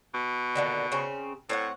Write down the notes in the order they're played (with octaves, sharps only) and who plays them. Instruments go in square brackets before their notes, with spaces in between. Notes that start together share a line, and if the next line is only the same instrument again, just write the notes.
[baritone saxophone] B2
[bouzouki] A#2 D3 D#3
C#3 C4 C#4
[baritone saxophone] A2 [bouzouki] C4 C#5 F#5